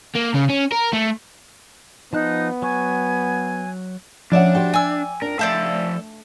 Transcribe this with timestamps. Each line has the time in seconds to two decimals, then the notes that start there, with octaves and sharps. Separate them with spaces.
0.16 A#3
0.35 C#3
0.50 C#4
0.72 A#4
0.93 A3
2.13 F3 B3 D#4 A5 F#6
2.62 F#3 G#5 C#6
4.32 D2 F3 C#4 D4 D5 E5 F#5
4.55 F#4 G4 C5 G5
4.74 D5 G#5 E6
5.22 F2 D4 A#4
5.39 F3 A3 A4 C5 D5 E5 F5